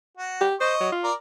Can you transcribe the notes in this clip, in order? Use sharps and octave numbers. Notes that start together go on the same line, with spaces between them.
F#4
G4
C5 D#5 C#6
F#3
F4
A#4 D5